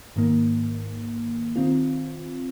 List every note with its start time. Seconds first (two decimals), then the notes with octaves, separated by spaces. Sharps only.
0.16 G#2 D#3 A#3
1.56 D#3 C4 F4